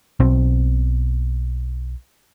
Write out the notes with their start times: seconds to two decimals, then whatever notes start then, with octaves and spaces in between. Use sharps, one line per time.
0.20 B1 B2 C4